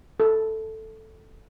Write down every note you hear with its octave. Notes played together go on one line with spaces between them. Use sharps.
A4